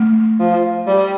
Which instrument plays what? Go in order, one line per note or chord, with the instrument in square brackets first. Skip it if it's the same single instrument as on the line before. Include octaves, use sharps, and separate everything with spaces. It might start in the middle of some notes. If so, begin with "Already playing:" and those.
Already playing: [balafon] A3
[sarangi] F3
G3